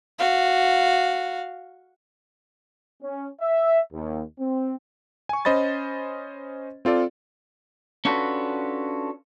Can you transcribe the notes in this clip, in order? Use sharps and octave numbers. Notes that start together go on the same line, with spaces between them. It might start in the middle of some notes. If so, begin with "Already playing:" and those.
F#4 F5
C#4
E5
D#2
C4
G#5 C#6
C#4 C5 D#5 B5 A6
C4 F4 A4 D5
C#4 D4 F4 F#4 A4 B4